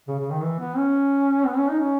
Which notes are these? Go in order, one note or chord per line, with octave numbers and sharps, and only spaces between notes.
C#3
C#3
D#3
E3
B3
C#4
B3
C#4
D#4
C#4